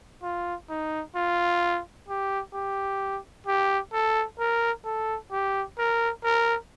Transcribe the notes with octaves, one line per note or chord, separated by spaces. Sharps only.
F4
D#4
F4
G4
G4
G4
A4
A#4
A4
G4
A#4
A#4